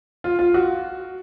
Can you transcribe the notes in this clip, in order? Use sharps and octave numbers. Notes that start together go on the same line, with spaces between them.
F4
F4
F#4